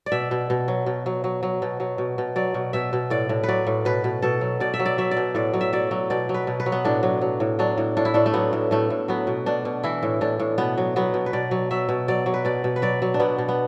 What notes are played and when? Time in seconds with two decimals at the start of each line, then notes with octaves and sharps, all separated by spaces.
0.06 D5
0.12 B2 E5
0.31 B2
0.50 B2
0.68 F#3
0.86 B2
1.06 F#3
1.24 F#3
1.43 F#3
1.62 B2
1.80 F#3
1.98 B2
2.18 B2
2.36 F#3 D5
2.54 B2
2.73 B2 E5
2.93 B2
3.10 A2 D5
3.29 A2
3.44 F#3 B4 D5
3.67 A2
3.85 B2 B4
4.04 B2
4.22 B2 A4
4.41 F#3
4.60 B2 D5
4.74 E5
4.80 F#3
4.86 D5
4.98 F#3 E5
5.11 D5
5.17 B2
5.35 A2 D5
5.54 F#3
5.61 E5
5.73 F#3 D5
5.91 F#3
6.10 B2 D5
6.29 F#3
6.34 B4
6.47 B2
6.60 B4
6.66 F#3
6.72 B3
6.85 A2 D4
7.03 F#3
7.21 F#3
7.40 A2
7.59 F#3 D4
7.78 A2
7.97 A2 D4
8.05 E4
8.14 A2 D4
8.26 A3
8.34 F#3 B3
8.53 A2
8.71 A2 A3
8.90 A2
9.08 F#3 B3
9.27 B2
9.46 B2 D4
9.65 B2
9.84 E3 E4
10.03 A2
10.21 A2 D4
10.40 A2
10.58 B2 B3
10.78 F#3
10.96 F#3 B3
11.14 B2
11.26 B4
11.33 B2 D5
11.51 F#3
11.71 F#3 E5
11.89 B2
12.08 F#3 D5
12.26 F#3
12.34 B4
12.45 B2 D5
12.64 B2
12.76 B4
12.82 F#3 D5
13.02 F#3
13.14 D4
13.20 B2 B3
13.38 B2
13.49 B3